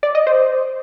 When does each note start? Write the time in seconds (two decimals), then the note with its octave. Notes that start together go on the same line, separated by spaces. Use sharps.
0.03 D5
0.15 D#5
0.27 C5